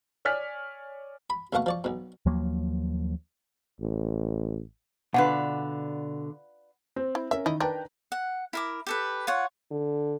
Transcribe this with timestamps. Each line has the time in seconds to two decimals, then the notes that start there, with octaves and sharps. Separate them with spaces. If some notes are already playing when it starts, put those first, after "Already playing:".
0.25 C#5 D5 G#5 F6 B6
1.30 B5
1.53 D#2 B2 A3 F5 F#5 C#6
1.66 F3 D5 C#6
1.84 B1 B2
2.26 D#2 F3 F#3 A#3
3.81 A1
5.14 B2 D3 D4 F4 B4 F#5
6.96 C4
7.15 E4
7.31 C#4 A#4 E5
7.46 D#3 E4 D#5
7.60 D#3 D4 B4 G5 A#5
8.12 F#5
8.53 E4 A#4 D6
8.87 G4 A4 B4
9.27 F4 C#5 F#5
9.71 D3